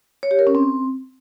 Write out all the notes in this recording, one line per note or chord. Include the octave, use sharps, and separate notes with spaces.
C#5
G4
A#4
C#4
C4